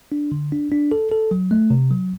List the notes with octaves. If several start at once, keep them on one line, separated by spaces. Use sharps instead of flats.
D4
D3
D4
D4
A4
A4
F#3
A3
C3
F#3